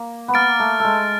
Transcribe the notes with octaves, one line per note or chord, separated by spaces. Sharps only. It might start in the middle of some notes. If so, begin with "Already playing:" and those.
Already playing: A#3
B3
A#3 F6 A6 D7
A3
G#3 A3